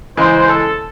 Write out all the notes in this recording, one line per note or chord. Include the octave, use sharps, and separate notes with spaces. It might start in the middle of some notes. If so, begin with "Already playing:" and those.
C#3 E3 G#3 C5
A4